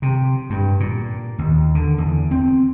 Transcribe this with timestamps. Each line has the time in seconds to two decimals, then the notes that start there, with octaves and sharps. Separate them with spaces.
0.02 C3
0.50 G2
0.80 A#2
1.38 D#2
1.75 D3
1.98 E2
2.31 C4